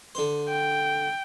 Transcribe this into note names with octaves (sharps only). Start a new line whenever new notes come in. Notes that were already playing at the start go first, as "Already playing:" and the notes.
D3 C5
G5